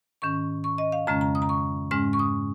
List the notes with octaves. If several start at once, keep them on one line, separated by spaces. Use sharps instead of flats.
G#2 D#3 C#4 C#6
C#6
D#5
F5
F2 C#3 G#3 C#4 A#5
A#5
D#6
A#5
C#6
G#2 G#3 C#4 F6
C#6
D#6